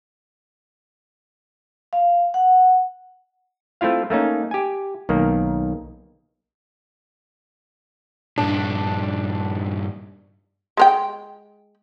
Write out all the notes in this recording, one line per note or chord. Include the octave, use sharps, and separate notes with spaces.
F5
F#5
A3 C4 E4 F4 F5
A3 A#3 C#4 D#4
G4 G#5
B1 D#3 A#3
G2 A#2 D4
G#3 A#4 G5